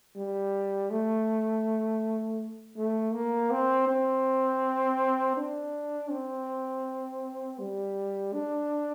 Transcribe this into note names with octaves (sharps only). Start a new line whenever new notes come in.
G3
A3
A3
A#3
C4
C4
D4
C4
G3
D4